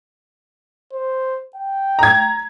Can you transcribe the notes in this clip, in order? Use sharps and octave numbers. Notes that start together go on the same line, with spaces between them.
C5
G5
A#5 G#6